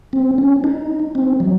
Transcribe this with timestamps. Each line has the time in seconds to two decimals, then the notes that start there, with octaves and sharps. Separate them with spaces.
0.13 C4
0.38 C#4
0.64 D#4
1.15 C4
1.40 F#3